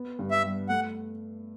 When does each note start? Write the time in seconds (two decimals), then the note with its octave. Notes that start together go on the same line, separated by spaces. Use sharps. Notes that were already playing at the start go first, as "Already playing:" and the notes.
Already playing: B3
0.19 G2
0.31 E5
0.43 G3
0.69 A3 F#5